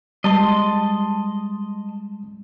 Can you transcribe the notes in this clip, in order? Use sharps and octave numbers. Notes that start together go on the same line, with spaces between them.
G3 G#3 D#5 A5 C6